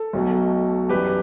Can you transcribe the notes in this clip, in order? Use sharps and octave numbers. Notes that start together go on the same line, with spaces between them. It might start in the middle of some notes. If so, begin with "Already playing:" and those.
Already playing: A4
B1 B2 F#3 A3
F#2 E3 G3 G4 B4